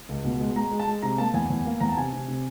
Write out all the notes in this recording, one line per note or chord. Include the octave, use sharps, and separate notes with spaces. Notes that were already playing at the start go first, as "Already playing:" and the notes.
C#2
B2
G#3
G#3 A#5
G#3
A5
G#3
C3 A#5
A#3 A5
E2 G#5
E2
A#3
E2 A#5
A5
C3 G#5
C3
C3